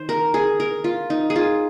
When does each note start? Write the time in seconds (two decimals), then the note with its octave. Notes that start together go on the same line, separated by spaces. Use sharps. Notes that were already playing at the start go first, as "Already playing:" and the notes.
Already playing: D#3 C5
0.09 A#4
0.34 G#4
0.60 A#4
0.84 F4
1.10 D#4
1.30 G#4
1.36 F4